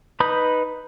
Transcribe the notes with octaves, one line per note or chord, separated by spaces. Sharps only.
D#4 B4 B5 D#6 G6